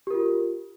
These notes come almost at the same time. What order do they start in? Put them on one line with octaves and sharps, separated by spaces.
G4 A#4 F4